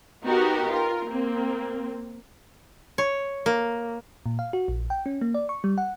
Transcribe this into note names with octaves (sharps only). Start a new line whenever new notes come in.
B3 D#4 F#4 G4 A#4
F4 A#4
A#3 C4
C#5
A#3
A#2
F5
F#4
A#1
G5
C#4
A#3
D5
C#6
G3
F#5